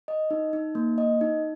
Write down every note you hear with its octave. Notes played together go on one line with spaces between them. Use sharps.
D#5
D#4
D#4
A#3
D#5
D#4